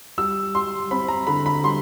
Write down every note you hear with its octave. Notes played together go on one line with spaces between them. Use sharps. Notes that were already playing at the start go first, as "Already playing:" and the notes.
G3 E6
G3 C6
C4 B5
A#5
D3 B5
B5
G3 C6